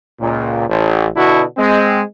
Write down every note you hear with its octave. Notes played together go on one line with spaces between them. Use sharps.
C#2 A#2
A1
B2 D3 D4 E4 F#4
G#3 C4